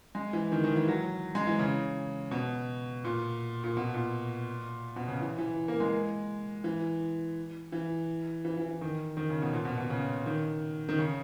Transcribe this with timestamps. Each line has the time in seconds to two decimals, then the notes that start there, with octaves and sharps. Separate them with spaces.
0.15 G#3
0.33 E3
0.52 D#3
0.64 D#3
0.76 E3
0.88 F#3
1.35 G#3
1.47 E3
1.59 C#3
2.31 B2
3.04 A#2
3.64 A#2
3.77 B2
3.94 A#2
4.96 B2
5.08 C#3
5.20 E3
5.38 E3
5.68 A#3
5.80 G#3
6.64 E3
7.72 E3
8.45 E3
8.57 E3
8.69 E3
8.81 D#3
9.17 D#3
9.29 C#3
9.42 B2
9.53 A#2
9.65 B2
9.78 B2
9.90 C#3
10.26 D#3
10.89 D#3
10.98 C#3